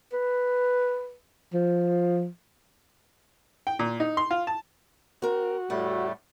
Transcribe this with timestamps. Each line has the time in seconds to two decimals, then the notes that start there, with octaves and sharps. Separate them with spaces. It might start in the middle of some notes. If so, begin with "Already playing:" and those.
0.13 B4
1.54 F3
3.67 G5
3.79 A#2
4.00 D#4
4.17 C6
4.31 F4
4.47 A5
5.22 C4 F#4 A#4
5.70 E2 A2 G3 A3 F#5